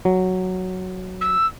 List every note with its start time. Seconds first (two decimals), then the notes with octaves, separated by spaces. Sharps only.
0.05 F#3
1.21 E6